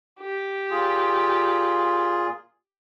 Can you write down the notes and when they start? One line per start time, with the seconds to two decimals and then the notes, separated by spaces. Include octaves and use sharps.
0.20 G4
0.70 A#2 F4 G#4